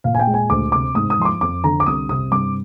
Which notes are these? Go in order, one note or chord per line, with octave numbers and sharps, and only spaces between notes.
A#2 F5
G#5
G5
G#3
G#5
D2 D6
C3 D6
G#2 D#6
D#6
F3 C6
D6
F2 D6
D3 A#5
D6
C2 D#6
C3 D#6
G2 D6